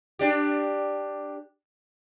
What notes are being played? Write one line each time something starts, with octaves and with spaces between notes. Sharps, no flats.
D4 G4